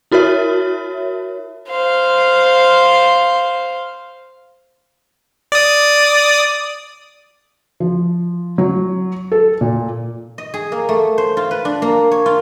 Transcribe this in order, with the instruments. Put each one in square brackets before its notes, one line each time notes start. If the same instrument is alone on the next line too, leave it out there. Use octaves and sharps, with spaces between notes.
[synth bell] E4 F#4 A#4 C#5 E5
[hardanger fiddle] C5 F5
[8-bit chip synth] D5 D#6
[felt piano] F3
F#3
A4
A#2
[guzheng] D#5
G#4
A#3
A3
C5
F4
B4
D4
A#3
C#5
F4